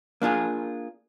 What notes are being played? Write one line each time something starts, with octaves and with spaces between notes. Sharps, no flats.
A#3 D4 F4 G#4